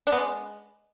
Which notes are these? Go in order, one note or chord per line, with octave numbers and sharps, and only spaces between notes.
D4
B3
G#3